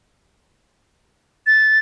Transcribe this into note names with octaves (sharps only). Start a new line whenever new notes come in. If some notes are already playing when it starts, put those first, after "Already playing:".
A6